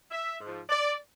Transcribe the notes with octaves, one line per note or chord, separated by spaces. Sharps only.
E5
G#2 F3
D5